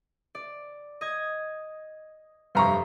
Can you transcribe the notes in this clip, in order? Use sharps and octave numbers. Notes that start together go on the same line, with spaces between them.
D5
D#5 G#6
F1 G2 E5 A#5 C6 C#6